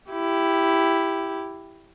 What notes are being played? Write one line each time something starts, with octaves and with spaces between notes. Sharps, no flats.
E4 G4